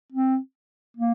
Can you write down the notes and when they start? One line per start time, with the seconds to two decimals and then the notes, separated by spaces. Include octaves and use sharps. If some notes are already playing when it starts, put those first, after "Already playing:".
0.12 C4
0.97 A#3